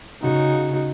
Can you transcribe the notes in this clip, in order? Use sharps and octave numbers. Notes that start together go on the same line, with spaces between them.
C#3 D#4 F#4